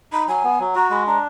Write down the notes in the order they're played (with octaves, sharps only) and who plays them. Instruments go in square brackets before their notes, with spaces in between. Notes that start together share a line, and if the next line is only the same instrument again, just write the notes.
[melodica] D#4 [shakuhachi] B5
[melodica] F#3 [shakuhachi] G#5
[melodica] B3
F#3
[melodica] F#4 [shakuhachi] A#5
[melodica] G#3 [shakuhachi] B5
[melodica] D4 [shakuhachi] A#5